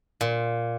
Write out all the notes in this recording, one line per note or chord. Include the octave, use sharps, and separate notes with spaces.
A#2